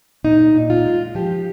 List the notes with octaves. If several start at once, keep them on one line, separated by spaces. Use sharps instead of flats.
A#2 D#4
A#2
F4
G#3
F3 G4